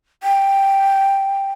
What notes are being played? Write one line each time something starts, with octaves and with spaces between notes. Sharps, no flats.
G5